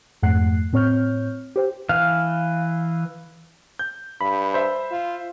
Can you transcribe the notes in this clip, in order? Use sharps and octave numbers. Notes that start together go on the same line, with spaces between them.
F2 G#2 A3 F#5 F#6 C7
A2 C4 C#5 C#6 F6 G6
G4 C5 G5
E3 F5
G6
G2 B5
C5 E5
F4